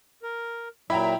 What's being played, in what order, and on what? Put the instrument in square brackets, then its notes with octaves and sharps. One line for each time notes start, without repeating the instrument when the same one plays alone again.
[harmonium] A#4
[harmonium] A#2 F#3 [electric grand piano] E4 B5 [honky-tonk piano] E5 G5 A#5